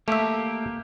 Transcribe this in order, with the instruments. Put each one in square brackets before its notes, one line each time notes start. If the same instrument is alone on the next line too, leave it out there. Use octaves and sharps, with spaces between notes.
[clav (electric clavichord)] A3 E5 [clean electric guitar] A#3 G4